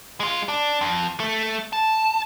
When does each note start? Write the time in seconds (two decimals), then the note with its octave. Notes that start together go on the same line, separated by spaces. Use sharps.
0.20 G#3 F4
0.48 D4
0.81 F2
1.20 A3
1.73 A5